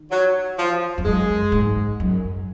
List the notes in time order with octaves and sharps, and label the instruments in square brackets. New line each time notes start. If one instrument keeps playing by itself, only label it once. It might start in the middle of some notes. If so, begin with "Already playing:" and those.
Already playing: [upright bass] D#3
[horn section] F#3
F3
[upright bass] F2
[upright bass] F#2 [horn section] G#3
[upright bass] G#2
F#2